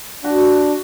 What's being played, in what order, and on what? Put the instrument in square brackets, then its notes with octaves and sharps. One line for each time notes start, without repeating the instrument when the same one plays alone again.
[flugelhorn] D4 [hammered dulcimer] F#4